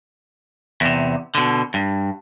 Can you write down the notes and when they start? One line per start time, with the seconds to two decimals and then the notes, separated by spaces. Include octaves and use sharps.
0.81 E2 C3
1.35 B2 D3
1.74 G2